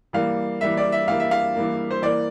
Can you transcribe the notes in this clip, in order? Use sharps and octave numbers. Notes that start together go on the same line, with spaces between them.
E3 G3 A#3 F5
E3 G3 A#3 E5
D5
E5
E3 G3 A#3 F5
E5
F5
E3 G3 A#3
C5
E3 A#3 D5